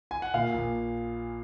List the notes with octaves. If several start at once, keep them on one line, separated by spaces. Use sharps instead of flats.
G#5
F#5
A#2 F5
A#1